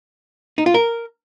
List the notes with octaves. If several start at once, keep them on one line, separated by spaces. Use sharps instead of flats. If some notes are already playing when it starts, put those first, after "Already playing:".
D#4
F4
A#4